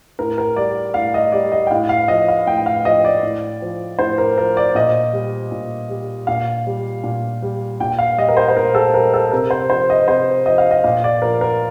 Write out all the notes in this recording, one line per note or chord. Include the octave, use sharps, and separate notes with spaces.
A2 A#4
A#4
G3 D5
A2 F5
D#5
G3 D5
D#5
G5
A2 F5
F5
F3 D#5
F5
A2 G5
F5
F3 D#5
D5
A2
F3
A2 C5
A#4
F3 A#4
D5
A#2 D#5
G3
A#2
G3
A#2 F5
G3
A#2
G3
A#2 G5
F5
G3 D#5
A#4
C5
C5
A#2 A#4
A4
G3 A#4
A4
C3 A#4
C5
F3 C5
D#5
C3 C5
F3 D#5
F5
D#5
A#2 F5
D5
F3 A#4
A#4